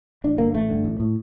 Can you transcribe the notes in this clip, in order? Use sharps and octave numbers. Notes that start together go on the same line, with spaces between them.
A1 D4
G2 D3 A#3
A1 A3
G2 D3
A1
A2